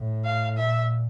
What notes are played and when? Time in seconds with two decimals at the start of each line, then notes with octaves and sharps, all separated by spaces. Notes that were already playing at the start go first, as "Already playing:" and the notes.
Already playing: A2
0.25 F5
0.57 A#2 E5